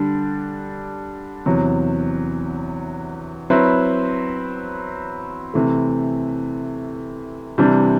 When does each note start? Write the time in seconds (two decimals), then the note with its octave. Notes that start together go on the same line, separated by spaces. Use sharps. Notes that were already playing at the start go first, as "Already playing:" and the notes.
Already playing: D3 G3 D4
1.46 E2 C3 F#3
3.50 F#3 C4 E4 B4
5.54 C3 E3 A3
7.58 C3 E3 G3 D4